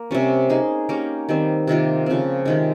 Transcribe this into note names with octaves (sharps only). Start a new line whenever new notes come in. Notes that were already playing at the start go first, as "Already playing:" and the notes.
Already playing: A#3
C3 G3 C#4
A#3 D#4 G#4
A#3 C#4 G4 A#4
D#3 G3 C4
C3 D#3 A#3 F4
C#3 F3 C4
C3 D#3 G#3